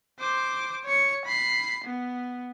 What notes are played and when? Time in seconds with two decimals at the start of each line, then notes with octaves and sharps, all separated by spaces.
0.19 C5 D6
0.85 C#5 C#7
1.25 B5 C7
1.84 B3